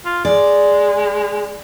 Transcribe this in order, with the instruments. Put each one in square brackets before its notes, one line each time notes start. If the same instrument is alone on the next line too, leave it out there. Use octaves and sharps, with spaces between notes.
[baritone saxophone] F4
[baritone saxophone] G#3 [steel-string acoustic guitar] D5